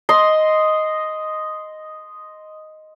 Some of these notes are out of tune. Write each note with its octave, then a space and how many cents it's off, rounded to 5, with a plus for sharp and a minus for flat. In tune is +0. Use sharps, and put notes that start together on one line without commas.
D#5 +0 C6 -5